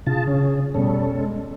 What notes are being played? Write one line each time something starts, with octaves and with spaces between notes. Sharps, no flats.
C3 D4 F4 G#4 A5
C#3 C#4
F1 B2 G3 B3 C#4 A4
G#3